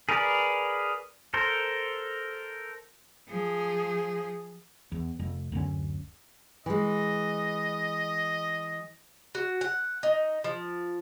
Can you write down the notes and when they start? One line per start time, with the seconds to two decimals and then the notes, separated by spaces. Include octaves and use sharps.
0.09 G#4 A#4 B4 D5
1.34 A4 A#4 C5
3.29 F3 G#4
4.92 E2
5.19 F1 F2
5.52 D1 F#2 D3 C#4
6.66 E3 G#3 D#5
9.35 F#4
9.61 F#5
10.03 D#4
10.44 F3